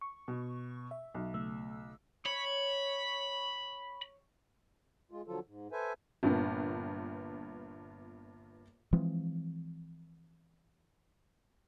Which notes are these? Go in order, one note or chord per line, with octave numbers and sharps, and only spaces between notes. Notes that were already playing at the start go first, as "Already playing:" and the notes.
C#6
B2
E5
B1
C#3 A3 E6
C#5 B5
G#3 F4
D3 F3 F#3 F4 A4
G#2
A4 B4 C5 E5 G#5
G1 G2 A#2 B3
E3 F3 G#3 C4